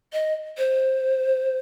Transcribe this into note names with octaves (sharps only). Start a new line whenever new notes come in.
D#5
C5